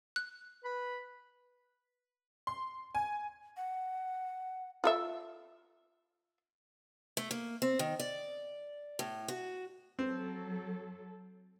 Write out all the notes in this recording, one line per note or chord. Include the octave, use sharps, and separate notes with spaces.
F#6
B4 B5
C6
G#5
F#5
F4 A4 E5
A3
A#3
C4
D#3
D5
A2
F#4
F#3 C4 A4